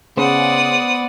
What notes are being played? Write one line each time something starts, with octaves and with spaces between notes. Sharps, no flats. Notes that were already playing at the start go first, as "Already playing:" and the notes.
C#3 B3 C5 D5 F#5 D#6